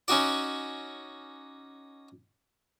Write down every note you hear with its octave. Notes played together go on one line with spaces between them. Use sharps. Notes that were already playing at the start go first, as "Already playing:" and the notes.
C#4 D#4 F#4 D5